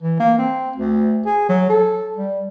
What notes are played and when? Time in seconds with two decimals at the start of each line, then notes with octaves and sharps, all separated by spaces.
0.02 E3
0.20 A#3
0.38 C4
0.76 D2
1.26 G#4
1.49 F#3
1.69 A4
2.17 G3